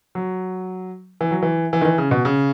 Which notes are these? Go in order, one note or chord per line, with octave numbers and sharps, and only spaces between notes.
F#3
E3
F#3
E3
E3
D#3
E3
C#3
B2
C#3